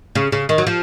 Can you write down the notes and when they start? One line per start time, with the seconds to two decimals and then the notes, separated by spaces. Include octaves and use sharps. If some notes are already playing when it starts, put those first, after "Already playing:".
0.15 C#3
0.32 C#3
0.49 D#3
0.58 F#3
0.67 F3